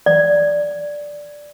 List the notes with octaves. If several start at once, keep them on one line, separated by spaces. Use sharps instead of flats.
D5